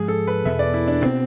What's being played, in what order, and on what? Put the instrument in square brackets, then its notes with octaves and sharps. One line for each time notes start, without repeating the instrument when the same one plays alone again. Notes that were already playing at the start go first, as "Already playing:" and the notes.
Already playing: [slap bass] G#2 F3 G#3 [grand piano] G#4
[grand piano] A4
B4
[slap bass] E2 B2 B3 [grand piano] E5
[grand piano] D5
E4
D4
[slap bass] B2 B3 D4 [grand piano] C4